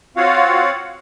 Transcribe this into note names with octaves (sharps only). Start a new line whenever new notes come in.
C4 F4 F#4 C#5 F5 F#5